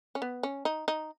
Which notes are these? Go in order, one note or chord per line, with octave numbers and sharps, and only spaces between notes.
C#4
B3
C#4
D#4
D#4